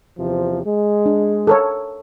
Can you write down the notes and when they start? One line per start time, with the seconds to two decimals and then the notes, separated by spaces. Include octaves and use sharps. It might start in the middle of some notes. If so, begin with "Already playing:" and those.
0.19 E2 C3 F3
0.65 G#3
1.06 D4
1.47 A4 A#4 C#5